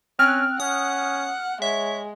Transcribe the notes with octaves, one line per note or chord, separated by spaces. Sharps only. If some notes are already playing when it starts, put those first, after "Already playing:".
C4 C#4 F6 F#6
C#4 F#5 D#6
G#3 C#5 E5